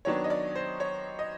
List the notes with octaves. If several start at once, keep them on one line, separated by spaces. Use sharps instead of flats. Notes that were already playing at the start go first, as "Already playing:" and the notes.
D#3 F#3 B3 D4 C#5
D#5
D5
C5
C#5
D#5